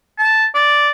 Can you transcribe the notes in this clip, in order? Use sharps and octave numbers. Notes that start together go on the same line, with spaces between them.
A5
D5